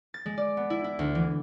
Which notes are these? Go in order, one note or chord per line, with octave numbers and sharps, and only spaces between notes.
A6
G#3
D5
B3
E4
E4
D2
E3